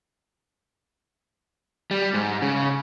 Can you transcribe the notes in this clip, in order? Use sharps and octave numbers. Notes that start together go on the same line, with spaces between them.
G3
G#2
C#3